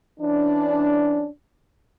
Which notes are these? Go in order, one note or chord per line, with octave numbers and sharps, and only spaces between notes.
E3 C#4 D4